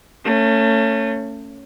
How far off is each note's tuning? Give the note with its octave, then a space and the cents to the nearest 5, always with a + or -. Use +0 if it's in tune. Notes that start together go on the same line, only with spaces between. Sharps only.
A3 +30 C#4 +0